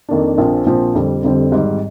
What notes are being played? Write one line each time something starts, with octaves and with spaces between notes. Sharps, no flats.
F2 D#3 A#3 D4
A#1 A#2 F3 C4
A#1 A#2 F3 C4
F1 F2 D3 G3 C4
F1 F2 D3 G3 C4
G#1 G#2 G3